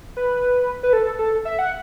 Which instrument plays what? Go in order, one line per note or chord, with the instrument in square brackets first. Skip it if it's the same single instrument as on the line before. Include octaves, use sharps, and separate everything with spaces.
[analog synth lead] B4
B4
A4
A4
E5
F#5